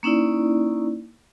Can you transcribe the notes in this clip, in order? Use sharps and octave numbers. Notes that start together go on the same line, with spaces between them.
A#3 C#4 D#4 E4 D5